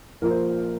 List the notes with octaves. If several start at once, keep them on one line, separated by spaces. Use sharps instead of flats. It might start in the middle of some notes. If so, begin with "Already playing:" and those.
A#1 A#2 F3 A#3 A#4
C5